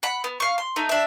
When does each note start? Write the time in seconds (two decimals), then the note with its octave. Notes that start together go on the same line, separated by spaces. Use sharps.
0.03 F#5 B5
0.24 B3
0.40 F5 C#6
0.58 C6
0.76 A3 D#4
0.89 D4 E5